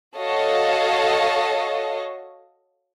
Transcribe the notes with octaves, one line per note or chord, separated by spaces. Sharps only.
F#4 A4 C#5 D#5 F5